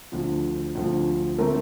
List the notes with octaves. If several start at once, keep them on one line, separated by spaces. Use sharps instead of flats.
D2 D3 F3
D2 D3 F3
D3 A3 C4 A#4